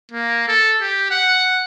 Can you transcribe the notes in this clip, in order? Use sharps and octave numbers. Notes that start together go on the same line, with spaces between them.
A#3
A4
G4
F#5